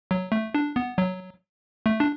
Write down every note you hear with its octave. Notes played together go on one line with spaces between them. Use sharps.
F#3
A3
D4
B3
F#3
A3
D4